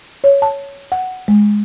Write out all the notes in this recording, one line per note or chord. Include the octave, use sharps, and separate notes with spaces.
C#5
A5
F#5
G#3